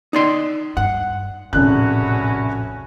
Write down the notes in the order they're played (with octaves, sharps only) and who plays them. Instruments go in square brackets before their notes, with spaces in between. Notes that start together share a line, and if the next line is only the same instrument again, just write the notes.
[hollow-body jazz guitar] D#4 D5 C6
[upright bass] G2 [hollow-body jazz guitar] F#5
[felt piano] F1 C#3 F#6 [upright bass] A#1 A2 [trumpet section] C#4 E4 F#4